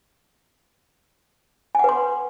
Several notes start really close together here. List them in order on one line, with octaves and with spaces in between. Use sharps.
G#5 F#5 B4 C6